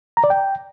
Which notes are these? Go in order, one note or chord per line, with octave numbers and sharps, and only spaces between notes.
A#5
D5
G5